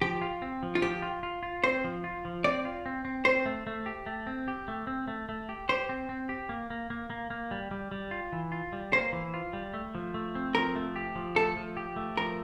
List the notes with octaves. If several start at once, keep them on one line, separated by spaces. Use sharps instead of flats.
F3 G4
F4
C4
F3
F4
F3 G4
F4
F4
F4
C4 C5
F3
F4
F3
C4 D5
F4
C4
C4
C4 C5
A3
A3
G4
A3
C4
G4
A3
C4
A3
A3
G4
G4 C5
C4
C4
G4
A#3
A#3
A#3
A#3
A#3
G3
G3
G3
F4
E3
F4
G3
A#3 C5
E3
F4
G3
A3
F3
A3
C4
F3 A#4
A3
G4
F3
A3 A4
F3
G4
A3
F3 A#4